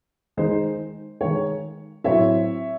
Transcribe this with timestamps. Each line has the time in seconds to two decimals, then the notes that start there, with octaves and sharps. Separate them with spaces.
0.37 D#3 G#3 D#4 C5 D#5
1.21 D#3 G#3 D#4 C#5
2.04 A2 F#3 C4 C#5 E5